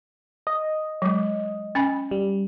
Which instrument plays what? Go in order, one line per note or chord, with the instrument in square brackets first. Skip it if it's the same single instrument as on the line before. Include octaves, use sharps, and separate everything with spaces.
[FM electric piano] D#5
[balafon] F#3 G#3
C#4 G#5 B5
[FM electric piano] G3